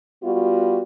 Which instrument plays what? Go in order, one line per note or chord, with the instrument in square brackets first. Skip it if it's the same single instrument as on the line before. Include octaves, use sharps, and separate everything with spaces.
[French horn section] G3 B3 F4 F#4